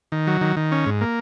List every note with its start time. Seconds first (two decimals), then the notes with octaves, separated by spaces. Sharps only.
0.12 D#3
0.27 F#3
0.41 D#3
0.57 D#3
0.72 C#4
0.86 G#2
1.01 A#3